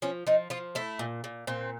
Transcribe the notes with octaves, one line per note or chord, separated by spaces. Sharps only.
F3 C#4
F3 D#4
F3 F4
A3 E4
A#2
A#2
A#2 C4